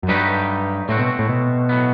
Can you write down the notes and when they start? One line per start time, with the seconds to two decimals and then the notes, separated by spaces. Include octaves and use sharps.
0.03 F#2
0.08 G2 F#3 A3 D#4 G4 B4
0.89 A2 A3 C4 F#4
0.99 B2
1.19 A2
1.29 B2
1.69 A2 F#3 B3